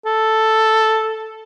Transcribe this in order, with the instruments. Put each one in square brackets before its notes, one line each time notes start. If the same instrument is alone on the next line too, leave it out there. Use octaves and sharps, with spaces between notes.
[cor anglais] A4